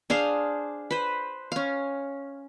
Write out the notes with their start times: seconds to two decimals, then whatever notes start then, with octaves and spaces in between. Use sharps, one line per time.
0.10 D4 G#4 C5 F5
0.91 B4 C5
1.52 C#4 F5